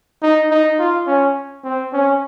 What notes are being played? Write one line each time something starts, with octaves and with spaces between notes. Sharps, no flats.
D#4
D#4
F4
C#4
C4
C#4